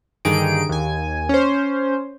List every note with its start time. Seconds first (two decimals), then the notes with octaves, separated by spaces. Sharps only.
0.25 G2 D3 D#3 D#4 G#4 D7
0.69 D#2 G#5
1.29 C#4 C5